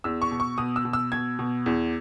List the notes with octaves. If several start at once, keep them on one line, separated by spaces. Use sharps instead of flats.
E2 E6
C#6
B2
C#6
B2 D#6
E6
B2
E6
B2 G#6
B2
E2